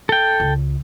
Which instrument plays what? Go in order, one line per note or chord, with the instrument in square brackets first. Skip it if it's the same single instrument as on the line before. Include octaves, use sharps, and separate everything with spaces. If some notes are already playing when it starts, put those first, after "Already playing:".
[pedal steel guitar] A4 G5
[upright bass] C#2